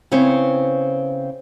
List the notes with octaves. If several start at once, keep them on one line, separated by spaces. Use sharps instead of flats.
C#3 B3 C4 E4 C#5